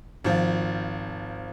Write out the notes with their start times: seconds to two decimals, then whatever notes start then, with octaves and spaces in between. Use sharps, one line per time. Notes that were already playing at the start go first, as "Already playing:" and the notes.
0.24 G#1 F3